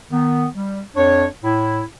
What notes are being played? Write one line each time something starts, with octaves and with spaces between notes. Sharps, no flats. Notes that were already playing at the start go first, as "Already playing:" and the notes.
D#3 B3
G3
F2 D4 C#5
A2 E4